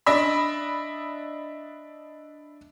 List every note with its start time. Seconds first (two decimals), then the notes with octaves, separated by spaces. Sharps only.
0.06 D4 D#5 E5 B5